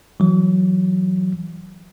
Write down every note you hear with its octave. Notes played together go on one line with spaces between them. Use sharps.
E3 F#3